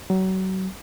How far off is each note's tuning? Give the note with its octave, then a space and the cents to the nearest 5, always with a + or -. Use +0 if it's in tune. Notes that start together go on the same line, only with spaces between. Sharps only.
F#3 +30